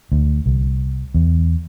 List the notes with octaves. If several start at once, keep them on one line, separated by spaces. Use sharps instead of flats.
D2
C2
E2